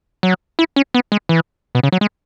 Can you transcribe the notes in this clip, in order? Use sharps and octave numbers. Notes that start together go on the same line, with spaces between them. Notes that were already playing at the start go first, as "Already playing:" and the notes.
F#3
E4
C#4
B3
G#3
E3
B2
C#3
F#3
G#3